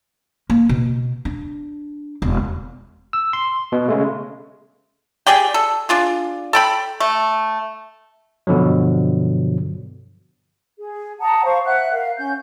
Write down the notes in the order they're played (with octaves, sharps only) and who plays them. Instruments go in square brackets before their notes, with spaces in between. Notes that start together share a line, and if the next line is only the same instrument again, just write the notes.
[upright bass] A#3
B2
D4
E1
[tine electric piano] E6
C6
B2
C#3 G#3 A3
[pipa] G4 G#4 D5 G5
A4
D4 F4 G#4
A4 G5 B5
A3
[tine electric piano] G2 B2 D3 F3 F#3
[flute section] G#4
F#5 A5 A#5 D#6
C5 F5 C#6
E5 F#5 F#6
A#4 F5
C#4 G6